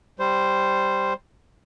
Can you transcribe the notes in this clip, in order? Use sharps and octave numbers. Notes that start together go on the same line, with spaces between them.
G3 C5